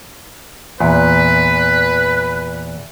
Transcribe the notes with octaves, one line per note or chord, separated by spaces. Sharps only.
E2 A#2 B4